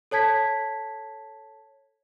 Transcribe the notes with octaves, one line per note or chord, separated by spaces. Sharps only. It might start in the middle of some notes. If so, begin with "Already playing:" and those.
A4 C#5 A5 G#6 B6